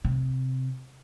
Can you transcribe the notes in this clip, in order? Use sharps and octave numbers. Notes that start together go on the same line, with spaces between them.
C3